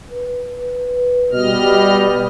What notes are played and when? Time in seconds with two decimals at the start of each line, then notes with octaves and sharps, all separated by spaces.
0.11 B4
1.32 B2 G3 D#5 F6